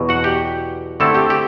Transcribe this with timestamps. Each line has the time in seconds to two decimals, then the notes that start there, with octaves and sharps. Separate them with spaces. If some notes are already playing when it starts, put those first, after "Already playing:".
Already playing: E2 B2 F#3
0.09 F#4 F#5
0.24 G4 G5
1.00 D3 A3 C4 E4 A4 A5
1.15 G4 G5
1.30 G4 G5